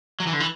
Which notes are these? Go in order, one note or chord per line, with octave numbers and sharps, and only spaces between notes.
F#3
E3
D3
E3